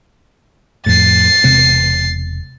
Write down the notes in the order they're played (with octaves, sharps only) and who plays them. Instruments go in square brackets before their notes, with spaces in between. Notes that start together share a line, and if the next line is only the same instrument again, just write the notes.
[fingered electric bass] F2 A2 [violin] A6 C7
[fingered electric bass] E1 C3 C4